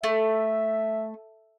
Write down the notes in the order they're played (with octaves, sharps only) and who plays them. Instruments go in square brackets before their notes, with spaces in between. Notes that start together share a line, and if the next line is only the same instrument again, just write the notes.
[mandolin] A3 [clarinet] E5